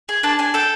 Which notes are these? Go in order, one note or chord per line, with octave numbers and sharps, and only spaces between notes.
G#4
D4 A5
D4 G#5
A4 G5